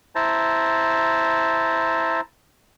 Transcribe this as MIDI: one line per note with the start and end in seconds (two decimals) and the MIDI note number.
0.15 2.21 64
0.15 2.21 72
0.15 2.21 81
0.15 2.21 82